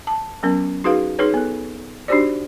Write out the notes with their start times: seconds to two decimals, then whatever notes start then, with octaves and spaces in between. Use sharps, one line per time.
0.07 A5
0.43 F#3 B3 C#4 A#4
0.84 D#4 F#4 G#4 B4 F5
1.19 D#4 G#4 B4 C#5
1.34 B3 A4
2.08 D4 D#4 F#4 G4 C5 D5